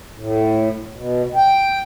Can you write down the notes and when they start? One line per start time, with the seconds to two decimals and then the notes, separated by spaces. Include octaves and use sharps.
0.17 A2
0.96 B2
1.35 G5